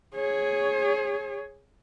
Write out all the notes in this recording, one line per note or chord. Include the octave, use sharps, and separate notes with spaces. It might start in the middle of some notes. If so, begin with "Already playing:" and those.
G#4 C#5